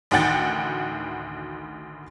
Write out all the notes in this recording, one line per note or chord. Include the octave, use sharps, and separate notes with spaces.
A1 D2 D#3 F#4 G5 A6